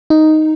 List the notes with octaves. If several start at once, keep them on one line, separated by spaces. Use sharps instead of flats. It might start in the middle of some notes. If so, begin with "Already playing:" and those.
D#4